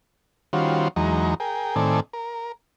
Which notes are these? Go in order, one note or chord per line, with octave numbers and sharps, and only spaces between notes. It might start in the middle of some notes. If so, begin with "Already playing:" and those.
D#3 G3 C#4 F4 F#4 C5
E2 F#3 G#3 D#4 A#5
G#4 A#4 G5
A2 D#3 C4 A4 D5 G#5
A#4